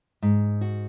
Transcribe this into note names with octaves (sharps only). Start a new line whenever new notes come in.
G#2
F#4